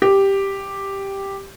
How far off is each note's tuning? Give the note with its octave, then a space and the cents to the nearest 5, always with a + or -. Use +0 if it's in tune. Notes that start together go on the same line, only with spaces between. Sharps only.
G4 +0